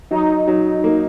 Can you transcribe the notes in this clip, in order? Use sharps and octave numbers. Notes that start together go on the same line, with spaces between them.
F#3 D#4
F#3
A#3